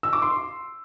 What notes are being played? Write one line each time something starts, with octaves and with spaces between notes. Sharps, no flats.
E6
D6
C6